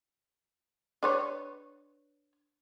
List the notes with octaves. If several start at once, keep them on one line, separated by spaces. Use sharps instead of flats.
D4 B4 C#5